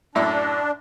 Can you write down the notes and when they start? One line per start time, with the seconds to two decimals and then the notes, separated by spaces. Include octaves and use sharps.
0.15 F#2 A2 D4 E4